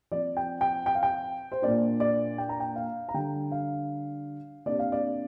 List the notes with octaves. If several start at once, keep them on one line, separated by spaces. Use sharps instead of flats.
F3 C4 D5
G5
G5
G5
F5
G5
C5
A#2 A#3 D4 D5
D5
G5
A#5
G5
F5
A#5
D3 G3 D4 G5
F5
C3 A#3 D4 D5
F5
D5